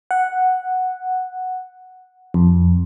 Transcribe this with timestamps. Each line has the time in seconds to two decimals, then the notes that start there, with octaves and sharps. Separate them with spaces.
0.11 F#5
2.34 F2